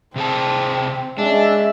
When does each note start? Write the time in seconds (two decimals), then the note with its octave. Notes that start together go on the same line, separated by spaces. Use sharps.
0.16 C3 C4 G#4 A5
1.18 G#3 C#4 D4 E5